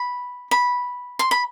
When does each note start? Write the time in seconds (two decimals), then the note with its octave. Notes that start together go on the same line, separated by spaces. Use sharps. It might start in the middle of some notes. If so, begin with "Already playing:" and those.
Already playing: B5
0.51 B5
1.19 C6
1.31 B5